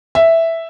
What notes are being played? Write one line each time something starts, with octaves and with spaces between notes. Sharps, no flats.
E5